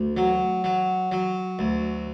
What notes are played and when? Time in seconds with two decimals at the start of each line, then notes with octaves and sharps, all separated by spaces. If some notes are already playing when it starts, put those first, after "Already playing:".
Already playing: D2
0.17 F#3
0.64 F#3
1.12 F#3
1.59 D2